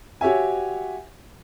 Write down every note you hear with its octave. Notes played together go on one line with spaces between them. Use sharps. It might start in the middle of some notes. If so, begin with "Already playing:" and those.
F#4 G4 C#5 E5 G#5